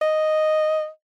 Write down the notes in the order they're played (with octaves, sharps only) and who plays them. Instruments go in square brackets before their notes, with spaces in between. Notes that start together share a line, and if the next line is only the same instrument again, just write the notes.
[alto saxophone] D#5